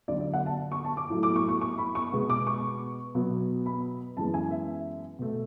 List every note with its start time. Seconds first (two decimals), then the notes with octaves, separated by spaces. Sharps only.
0.08 D2 D3 F#3 D5
0.21 D5
0.33 F#5
0.46 A5
0.72 C#6
0.85 A5
0.97 D6
1.10 A2 F#3 A3
1.23 D6
1.36 C#6
1.49 C#6
1.61 C#6
1.78 B5
1.95 C#6
2.12 B2 G#3 B3
2.30 D6
2.47 C#6
3.15 B2 F#3 B3
3.66 B5
4.17 F#2 E3 G#3 B3 A5
4.34 G#5
4.51 E5
5.19 B2 A3